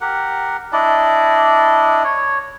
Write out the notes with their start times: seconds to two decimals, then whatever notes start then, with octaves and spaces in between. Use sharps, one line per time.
0.01 G4 A#4 F#5
0.72 D4 E4 D5 D#5
2.04 C#5